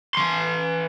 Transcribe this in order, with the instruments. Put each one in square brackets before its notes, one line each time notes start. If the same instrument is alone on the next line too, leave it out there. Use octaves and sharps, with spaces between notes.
[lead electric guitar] E3 C6